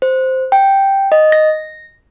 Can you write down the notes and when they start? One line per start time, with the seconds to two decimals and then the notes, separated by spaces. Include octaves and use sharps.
0.02 C5
0.52 G5
1.12 D#5
1.32 A#6